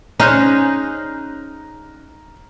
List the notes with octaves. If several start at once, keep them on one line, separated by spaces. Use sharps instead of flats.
C#4 D#4 G#4 C5 A#5 F6 F#6